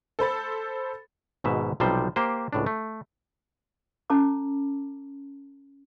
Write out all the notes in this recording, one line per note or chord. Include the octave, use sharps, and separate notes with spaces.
A4 C5 B5 A6
G#1 G#2 B2 E5
B1 C3 F3 G3 C5
A#3 G4 C5
C#2 A2 D4
A3
C#4 A4 A5 A#5 D6